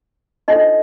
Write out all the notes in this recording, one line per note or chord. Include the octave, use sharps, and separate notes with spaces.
D4 D#4 F4 A4 C5 D#5